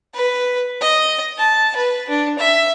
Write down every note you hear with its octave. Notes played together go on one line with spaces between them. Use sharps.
B4
D#5
A5
B4
D4
E5